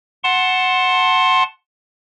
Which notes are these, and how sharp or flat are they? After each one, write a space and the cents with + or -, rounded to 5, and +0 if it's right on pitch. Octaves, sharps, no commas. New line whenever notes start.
F#5 +0 A5 +0 C6 +20